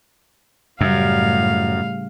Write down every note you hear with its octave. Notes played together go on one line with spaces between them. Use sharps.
F#2 A2 C#3 G3 F5